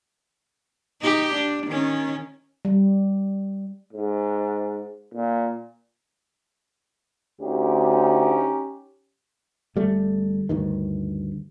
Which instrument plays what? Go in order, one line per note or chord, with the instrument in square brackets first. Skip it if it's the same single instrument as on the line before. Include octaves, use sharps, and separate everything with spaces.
[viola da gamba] D#4 G4
D4
D#3 C#4
[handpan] G3
[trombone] G#2
A#2
[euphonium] D2 [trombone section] C#4 D#4 G4
[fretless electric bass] G1 G3 A3
D2 G2 D#3